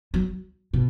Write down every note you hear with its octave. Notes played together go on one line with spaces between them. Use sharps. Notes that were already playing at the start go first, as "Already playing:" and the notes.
F#3
B2